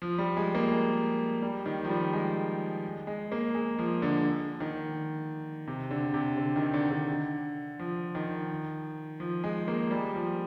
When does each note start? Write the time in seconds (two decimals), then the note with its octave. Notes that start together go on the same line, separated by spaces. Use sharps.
0.02 F3
0.18 G3
0.37 G#3
0.55 A#3
0.72 G#3
1.42 G3
1.66 D#3
1.84 F3
1.89 G3
2.13 G#3
3.07 G#3
3.32 A#3
3.55 G#3
3.79 F3
4.02 D3
4.60 D#3
5.67 C3
5.91 D3
6.14 C3
6.37 D3
6.56 D#3
6.74 D3
6.90 D3
7.79 F3
8.15 D#3
9.20 F3
9.44 G#3
9.68 A#3
9.91 G3
10.15 F3